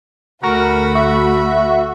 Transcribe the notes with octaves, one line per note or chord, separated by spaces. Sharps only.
D2 A3 F#4 A#4 B5
F#4 E5